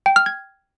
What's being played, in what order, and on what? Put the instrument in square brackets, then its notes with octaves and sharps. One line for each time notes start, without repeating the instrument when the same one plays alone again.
[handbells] G5
F6
G#6